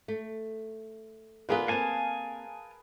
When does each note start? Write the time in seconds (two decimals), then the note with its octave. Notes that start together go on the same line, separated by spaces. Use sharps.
0.08 A3
1.49 D3 B3 F4 G#4 A#4 B4
1.68 A#3 C4 F5 G#5 A5